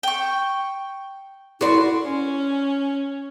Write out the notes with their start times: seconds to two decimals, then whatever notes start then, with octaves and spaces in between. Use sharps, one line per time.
0.03 G5 C#6
1.61 E4 F#4 A4 B4 D5 C6
2.04 C#4